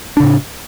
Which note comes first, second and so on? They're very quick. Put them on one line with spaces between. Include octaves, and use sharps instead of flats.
D4 C#3 A2